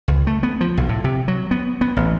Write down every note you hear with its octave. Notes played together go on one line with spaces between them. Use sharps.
C#2
A3
B3
F3
B1
A2
C3
F#3
B3
B3
A1